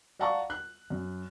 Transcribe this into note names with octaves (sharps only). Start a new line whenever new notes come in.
D5 F5 F#5 A5 A#5 C#6
F#6
F#2